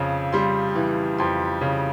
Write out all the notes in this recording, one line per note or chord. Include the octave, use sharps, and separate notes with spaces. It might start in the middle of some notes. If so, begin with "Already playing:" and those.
Already playing: F2 C#3
G3 C6
E3
F2 C6
C#3